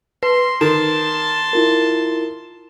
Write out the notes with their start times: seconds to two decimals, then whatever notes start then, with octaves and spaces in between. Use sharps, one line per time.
0.23 B4 C6 C7
0.61 D#3 A5 C6 E7
1.53 E4 F4 A#4